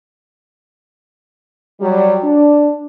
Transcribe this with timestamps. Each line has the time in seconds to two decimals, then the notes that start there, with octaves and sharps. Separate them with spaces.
1.80 F#3 G3
2.22 D4